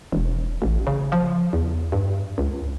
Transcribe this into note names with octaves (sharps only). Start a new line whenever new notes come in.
E1
A1
C#3
F3
E2
G2
C#2